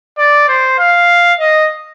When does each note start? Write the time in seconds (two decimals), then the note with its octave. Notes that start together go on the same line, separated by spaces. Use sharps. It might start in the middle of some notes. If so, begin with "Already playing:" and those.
0.18 D5
0.48 C5
0.79 F5
1.39 D#5